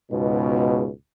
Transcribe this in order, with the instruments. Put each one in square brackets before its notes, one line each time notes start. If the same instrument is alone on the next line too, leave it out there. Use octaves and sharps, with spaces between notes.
[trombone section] C#2 G#2 B2